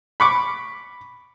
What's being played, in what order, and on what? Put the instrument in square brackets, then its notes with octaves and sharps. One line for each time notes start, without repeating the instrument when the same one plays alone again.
[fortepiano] B5 C#6 D6